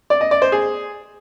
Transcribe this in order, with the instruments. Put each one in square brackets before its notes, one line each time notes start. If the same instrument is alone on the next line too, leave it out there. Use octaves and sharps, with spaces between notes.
[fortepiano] D5
D#5
D5
C5
G#4